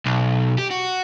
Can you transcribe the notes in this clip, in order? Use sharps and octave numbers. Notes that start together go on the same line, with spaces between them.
B1
G4
F#4